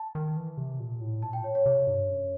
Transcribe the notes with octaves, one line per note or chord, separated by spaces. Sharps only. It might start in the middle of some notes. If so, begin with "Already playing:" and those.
Already playing: A5
D#3
E3
C3
A#2
A2
A#2 A5
G5
C#5
C#5
C3
G2
F#2